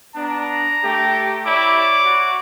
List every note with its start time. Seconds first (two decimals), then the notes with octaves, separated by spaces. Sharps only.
0.15 B3 D4 A#5
0.83 A3 G4
1.46 E4 C#5 D5 D6
2.05 F#4